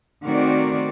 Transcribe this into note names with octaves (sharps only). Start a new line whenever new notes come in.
D#3 A3 C4 F#4 A#4 D5